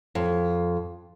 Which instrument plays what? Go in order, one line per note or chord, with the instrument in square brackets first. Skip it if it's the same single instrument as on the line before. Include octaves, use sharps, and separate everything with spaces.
[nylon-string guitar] F2